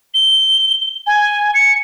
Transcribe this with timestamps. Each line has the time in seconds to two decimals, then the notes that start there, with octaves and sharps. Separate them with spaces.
0.14 G7
1.07 G#5
1.54 C#7